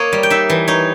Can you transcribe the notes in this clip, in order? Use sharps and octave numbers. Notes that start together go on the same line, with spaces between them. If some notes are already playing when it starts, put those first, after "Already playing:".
Already playing: A#3 C#5 D#5
G3
G5
D#4 E5
E3
D#4 C#5